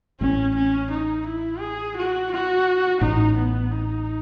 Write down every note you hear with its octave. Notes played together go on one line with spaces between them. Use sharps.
A1 A2 C#4
C#4
D#4
E4
G#4
F#4
F#4
A1 A2 D#4
B3
D#4